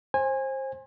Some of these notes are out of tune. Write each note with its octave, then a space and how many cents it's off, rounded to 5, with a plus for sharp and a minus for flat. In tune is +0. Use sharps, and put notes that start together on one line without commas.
C5 +25 G#5 -20